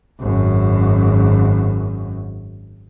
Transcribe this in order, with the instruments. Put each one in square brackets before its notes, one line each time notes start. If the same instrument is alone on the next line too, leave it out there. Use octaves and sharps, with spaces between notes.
[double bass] G#1 F#2